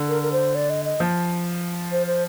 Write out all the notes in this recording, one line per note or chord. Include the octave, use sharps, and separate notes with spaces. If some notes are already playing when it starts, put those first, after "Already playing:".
Already playing: D3
A#4
A#4
C5
D5
D#5
D#5
F3
C5
C5